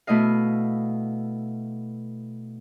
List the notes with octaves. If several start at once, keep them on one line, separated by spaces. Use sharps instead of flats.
B2 A3 E4 D#5 F5